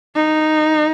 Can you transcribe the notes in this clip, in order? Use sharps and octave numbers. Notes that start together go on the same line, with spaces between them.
D#4